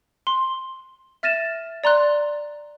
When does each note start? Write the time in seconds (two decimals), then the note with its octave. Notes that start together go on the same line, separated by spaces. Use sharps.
0.27 C6
1.23 E5 F6 A6 A#6 D#7 E7
1.84 D5 A#5 C6 F#6